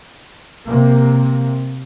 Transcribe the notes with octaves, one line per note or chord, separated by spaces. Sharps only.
C3 A#3